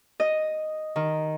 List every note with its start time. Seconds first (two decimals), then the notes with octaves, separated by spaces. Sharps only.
0.20 D#5
0.96 D#3